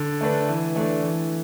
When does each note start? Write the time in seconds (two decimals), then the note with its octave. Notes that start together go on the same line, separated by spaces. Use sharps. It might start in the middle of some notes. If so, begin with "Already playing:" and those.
Already playing: D3
0.21 A3 D4 B4
0.48 E3
0.76 A3 D4
1.03 E3